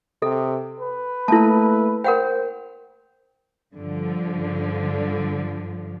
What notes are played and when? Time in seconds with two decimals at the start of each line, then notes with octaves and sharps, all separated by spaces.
0.22 C3 A4
0.80 B4
1.28 A3 A#3 E4 A4 A5
2.04 A#4 C5 F#5 G5
3.74 G2 D3 F3